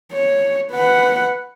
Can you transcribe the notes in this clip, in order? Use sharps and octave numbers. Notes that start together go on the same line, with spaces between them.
C#5
B4 F#5